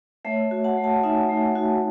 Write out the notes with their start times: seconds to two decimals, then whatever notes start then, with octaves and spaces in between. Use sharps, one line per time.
0.25 A3 C#5 E5
0.51 F#4
0.64 F#5 A5
0.77 A3
0.84 F#5 A5
1.03 D#4 E5 G#5
1.29 A3
1.55 F#4